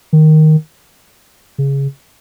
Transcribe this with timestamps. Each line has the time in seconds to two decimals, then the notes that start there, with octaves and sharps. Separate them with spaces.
0.13 D#3
1.58 C#3